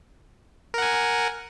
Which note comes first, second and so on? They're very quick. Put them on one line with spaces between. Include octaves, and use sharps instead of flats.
A#4 F#5 G#5